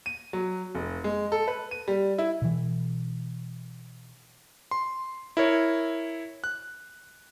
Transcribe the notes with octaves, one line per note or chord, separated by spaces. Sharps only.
D#7
F#3
F1
G#3
A4
B4
D#7
G3
E4
B2 E3
C6
E4 A#4 C#5
F#6